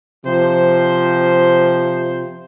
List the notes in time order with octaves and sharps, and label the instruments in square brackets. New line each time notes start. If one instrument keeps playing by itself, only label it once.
[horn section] C3 F3 C5